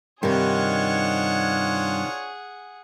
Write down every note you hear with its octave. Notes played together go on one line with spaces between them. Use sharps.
G2 C3 D#3 D4 F4 G#4 C#5 F#5